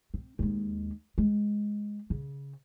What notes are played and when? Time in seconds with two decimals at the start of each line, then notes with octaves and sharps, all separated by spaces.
0.14 C4
0.39 D#2 G#3
1.18 G#3
2.10 C#3